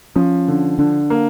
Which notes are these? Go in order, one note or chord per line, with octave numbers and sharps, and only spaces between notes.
F3 C#4
D3
D3 D4
A#3